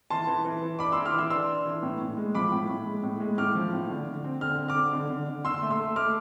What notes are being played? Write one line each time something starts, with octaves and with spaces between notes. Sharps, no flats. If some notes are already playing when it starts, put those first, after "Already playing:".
E3 A5 C6
E3
E3
E3
D4 B5 D6
E3 C6 E6
D6 F6
E3 C6 E6
D4 C6 E6
D4
E3
A2
A2
G#3
F3 B5 D6
A2
A2
G#3
A2
G#3
A2 D6 F6
F3
A2
D3
D3
C4
D3 F6
C4
D6 F6
D3
D3
D3
D3
D3 C6 E6
A3
C6 E6
A3
A3 D6 F6